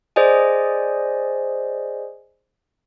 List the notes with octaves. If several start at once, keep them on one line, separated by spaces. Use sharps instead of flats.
G#4 C5 D5 D#5 G#5